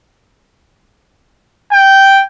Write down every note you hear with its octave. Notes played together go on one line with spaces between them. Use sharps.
G5